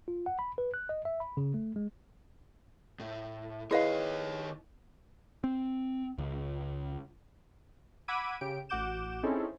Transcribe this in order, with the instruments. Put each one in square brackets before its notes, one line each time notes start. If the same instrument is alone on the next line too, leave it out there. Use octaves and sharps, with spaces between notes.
[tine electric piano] F4
F#5
B5
B4
F#6
D#5
E5
B5
C#3
A3
G#3
[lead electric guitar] A2
[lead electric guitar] D#3 C#5 [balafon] E4 D#5 [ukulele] G#4 B4 F5
[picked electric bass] C4
C#2
[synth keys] F#5 B5 D6 E6 G#6 D#7
C#3 G4 D7
A1 F#4 F#5 D6 G6 E7
C4 C#4 D#4 E4 G#4 A4